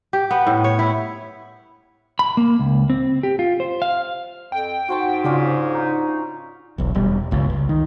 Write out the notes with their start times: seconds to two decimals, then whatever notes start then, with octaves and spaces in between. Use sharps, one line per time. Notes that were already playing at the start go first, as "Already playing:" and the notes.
0.13 G4
0.31 B3
0.47 A2
0.64 C#5
0.79 E4
2.19 B5
2.37 A#3
2.59 C#2
2.90 C4
3.23 G4
3.39 F4
3.60 C5
3.82 F5
4.52 F2 G5
4.88 G#2 F#4 C5 A5
5.24 C#3 C#4 D4 F4
5.75 D#4
6.78 E1 B1
6.95 E1 G3
7.31 G1 C#2
7.50 C#2
7.69 D#3